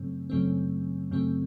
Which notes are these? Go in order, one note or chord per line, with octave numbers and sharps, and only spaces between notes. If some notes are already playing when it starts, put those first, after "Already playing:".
Already playing: F#2 C#3 F#3 A3 C4
F#2 C#3 F#3 A3 C4
F#2 C#3 F#3 A3 C4